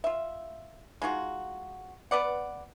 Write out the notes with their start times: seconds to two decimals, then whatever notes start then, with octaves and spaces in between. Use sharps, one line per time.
0.04 F4 E5
1.02 G#3 D#4 F4 F#4
2.11 B3 B4 D5 F#5